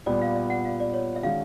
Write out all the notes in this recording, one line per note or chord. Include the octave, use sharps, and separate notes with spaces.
A#2 G3 B3 D5
F5
E5
F#5
F5
D5
C#5
E5
D#3 G#3 C#4 F#4 F5